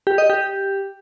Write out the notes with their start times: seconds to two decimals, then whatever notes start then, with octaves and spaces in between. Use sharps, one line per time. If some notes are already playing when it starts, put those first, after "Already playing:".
0.07 G4
0.18 D#5
0.30 G4